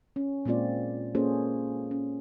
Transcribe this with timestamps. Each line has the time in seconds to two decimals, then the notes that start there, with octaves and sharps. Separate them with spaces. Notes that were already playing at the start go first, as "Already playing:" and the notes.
0.16 C#4
0.45 A#2 G#3 A#3 C4 F4 D5
1.15 A#3 C#4 F4 G#4 A4 C5
1.91 C#4